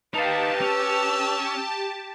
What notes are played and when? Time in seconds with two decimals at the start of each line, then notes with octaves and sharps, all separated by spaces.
0.14 D#4 G4 B4 F5 A5
0.61 C#4 E6